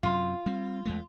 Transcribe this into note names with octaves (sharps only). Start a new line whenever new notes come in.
F#2 C3 F#3 F4
G3 C4
E2 G#3 A3